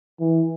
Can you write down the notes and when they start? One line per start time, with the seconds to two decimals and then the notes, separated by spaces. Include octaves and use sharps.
0.20 E3